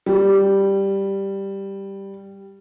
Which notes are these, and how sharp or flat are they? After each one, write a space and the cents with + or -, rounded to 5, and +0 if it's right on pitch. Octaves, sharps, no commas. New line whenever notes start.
G3 +0